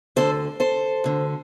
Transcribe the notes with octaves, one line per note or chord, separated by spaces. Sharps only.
D2 D3 A4 C5
A4 C5
D2 D3